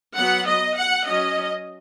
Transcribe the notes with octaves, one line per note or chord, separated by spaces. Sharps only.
F#3 B3 F#5
D#5
F#5
F#3 C#4 D#5